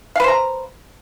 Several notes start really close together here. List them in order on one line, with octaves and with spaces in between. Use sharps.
F5 B4 C5 A#5